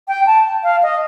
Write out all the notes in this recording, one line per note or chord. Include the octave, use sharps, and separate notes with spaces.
G5
A5
F5
D#5